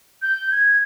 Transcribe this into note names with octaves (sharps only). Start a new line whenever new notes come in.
G6
G#6